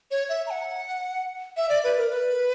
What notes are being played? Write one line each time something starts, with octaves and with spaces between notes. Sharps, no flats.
C#5
E5
A#5
F#5
E5
D5
B4
A#4
B4